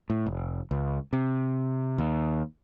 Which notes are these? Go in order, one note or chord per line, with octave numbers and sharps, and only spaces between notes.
A2
F1
C#2
C3
D#2